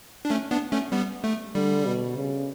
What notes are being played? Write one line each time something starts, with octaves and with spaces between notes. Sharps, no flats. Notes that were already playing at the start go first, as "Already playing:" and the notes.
D4
A3 C#4
B3 D4
A3 C#4
G3 B3
A3
D3 G3
B2
C#3